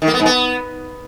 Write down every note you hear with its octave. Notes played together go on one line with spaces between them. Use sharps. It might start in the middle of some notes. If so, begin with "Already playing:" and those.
D#3
A#3
B3
G#2
B3